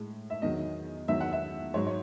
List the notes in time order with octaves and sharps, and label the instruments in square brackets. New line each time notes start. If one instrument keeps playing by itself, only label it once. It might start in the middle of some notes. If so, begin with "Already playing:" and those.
Already playing: [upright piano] A2 G#3
E5
E2 D#3 F#3 D#5
E2 D#3 F#3 E5
F#5
E5
G#2 F#3 C#5
C#5